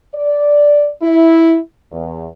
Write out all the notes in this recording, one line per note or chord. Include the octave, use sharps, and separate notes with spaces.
D5
E4
E2